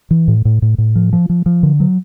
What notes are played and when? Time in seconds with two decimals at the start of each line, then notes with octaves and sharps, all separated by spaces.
0.11 E3
0.28 A2
0.45 A2
0.62 A2
0.78 A2
0.95 F3
1.13 F3
1.29 F3
1.46 F3
1.63 D3
1.80 F#3